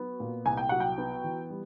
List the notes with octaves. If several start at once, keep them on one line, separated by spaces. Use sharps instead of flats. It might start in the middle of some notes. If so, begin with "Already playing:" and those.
Already playing: F#3 B3
A#2
C2 G#5
G5
F#3 F#5
G5
B3
E3
G3